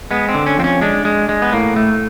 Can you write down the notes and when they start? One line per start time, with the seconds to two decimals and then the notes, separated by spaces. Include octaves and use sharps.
0.11 G#3 B3
0.29 C4
0.34 D3
0.46 C#4
0.58 F2 C4
0.64 C#4
0.81 G#3 D4
1.05 G#3
1.29 G#3
1.42 B3
1.52 A2 A#3
1.76 A3